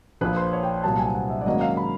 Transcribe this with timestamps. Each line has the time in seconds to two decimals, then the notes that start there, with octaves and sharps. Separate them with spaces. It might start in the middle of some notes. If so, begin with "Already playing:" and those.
0.21 A#1 A#2 F3 B4
0.36 C5
0.53 C#5
0.63 G5
0.84 C2 A#2 F#3 B3 A5
0.99 G#5
1.15 F#5
1.30 E5
1.41 D5
1.46 G#2 D#3 F#3 A#3 C#4 D#5
1.61 F5
1.77 B5